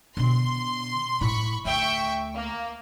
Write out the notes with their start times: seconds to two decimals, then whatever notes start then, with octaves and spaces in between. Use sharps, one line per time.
0.17 B2 D3 C6
1.21 A2 E4 B5 C#6
1.65 D2 E5 G5 C#6
2.35 A#3